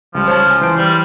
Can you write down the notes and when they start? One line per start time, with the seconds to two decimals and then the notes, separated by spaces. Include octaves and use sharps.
0.15 C#2 F3 G3
0.28 C5 C#5 A5 F6
0.46 C#2 G#5
0.61 E3 C5 D7
0.76 G3